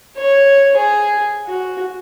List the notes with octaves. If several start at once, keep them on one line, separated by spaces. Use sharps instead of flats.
C#5
G#4
F#4